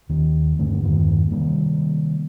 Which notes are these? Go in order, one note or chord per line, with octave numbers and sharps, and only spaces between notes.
D#1 D#2 D#3
G2 D3 A3
E2 G2 D#3 A#3
C3 D#3 G3 A#3